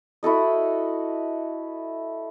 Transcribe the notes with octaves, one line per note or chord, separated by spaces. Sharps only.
E4 F#4 A4 D#5